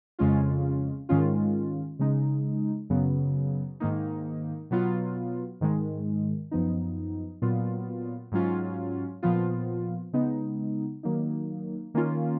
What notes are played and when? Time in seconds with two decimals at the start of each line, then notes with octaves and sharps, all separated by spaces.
0.19 F2 C#3 G#3 C#4 F4
1.09 G#2 D#3 G#3 C#4 F4
1.99 C#3 G#3 D#4
2.90 F#2 C#3 F#3 B3
3.80 G#2 D#3 A#3 D#4
4.71 B2 F#3 B3 F4
5.61 G#2 D#3 G#3
6.51 F#2 F3 B3 D#4
7.42 A#2 F#3 B3 F4
8.32 G#2 F#3 C#4 F4
9.23 A#2 F3 B3 F4
10.13 C#3 G#3 B3 D#4
11.03 D#3 F#3 A#3 D#4
11.94 D#3 A#3 C#4 F4